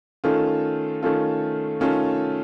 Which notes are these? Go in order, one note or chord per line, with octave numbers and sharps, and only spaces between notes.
D#3 A3 C#4 F4 A4
D#3 A3 C#4 F4 A4
D#3 A3 C#4 F4 A4